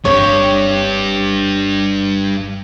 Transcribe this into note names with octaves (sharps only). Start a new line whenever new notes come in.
G1 G2 C4 G4 C#5